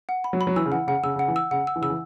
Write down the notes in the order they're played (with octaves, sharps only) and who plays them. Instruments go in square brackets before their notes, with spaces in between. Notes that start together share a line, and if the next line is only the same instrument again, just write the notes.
[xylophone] F#5
B5
[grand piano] F#3
[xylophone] B5
[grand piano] F#3
[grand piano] E3 [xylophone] E6
[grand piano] C#3
[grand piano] E3 [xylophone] F#5
[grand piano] C#3 [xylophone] F#5
[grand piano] C#3 [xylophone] E6
[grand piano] C#3 [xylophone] F#5
[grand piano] E3
[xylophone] E6
[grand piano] C#3 [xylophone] F#5
[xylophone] E6
[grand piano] E3
[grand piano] C#3 [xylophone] E6
[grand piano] E3